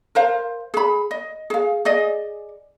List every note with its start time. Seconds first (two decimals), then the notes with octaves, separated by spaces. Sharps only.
0.15 A#4 C5 F5
0.74 G#4 B5
1.11 D#5
1.50 G#4 F5
1.85 G#4 D5 D#5